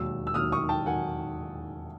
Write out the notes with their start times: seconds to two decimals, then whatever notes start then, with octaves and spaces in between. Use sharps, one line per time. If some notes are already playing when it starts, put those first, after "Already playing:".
Already playing: E1 D#2 D#3 F#3 E6
0.27 E6
0.34 E1 D#2 D#3 F#3 D#6 F6
0.52 C#6 D#6
0.69 G5 A5
0.86 D#3 F#3 F#5 G#5